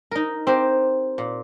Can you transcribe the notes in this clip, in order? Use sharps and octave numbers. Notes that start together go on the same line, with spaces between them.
D#4 A#4
C4 G4 A#4
A#2